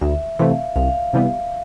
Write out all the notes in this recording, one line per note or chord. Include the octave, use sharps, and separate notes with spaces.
D2 E5
C3 E3 A3 F5
C2 F5
C3 E3 G3 B3